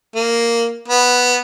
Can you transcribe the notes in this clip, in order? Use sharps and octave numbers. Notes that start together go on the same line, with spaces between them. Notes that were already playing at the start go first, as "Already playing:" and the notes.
A#3
B3